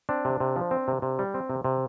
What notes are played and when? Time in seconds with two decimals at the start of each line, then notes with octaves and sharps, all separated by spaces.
0.09 C4 D4
0.25 C3
0.40 C3
0.56 F3
0.71 C4
0.88 C3
1.02 C3
1.19 G3
1.34 C4
1.50 C3
1.64 C3